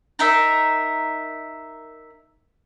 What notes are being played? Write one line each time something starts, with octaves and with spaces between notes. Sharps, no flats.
D#4 A#4 E5